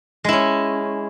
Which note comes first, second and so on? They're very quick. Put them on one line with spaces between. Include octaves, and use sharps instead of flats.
G#3 E4 C#4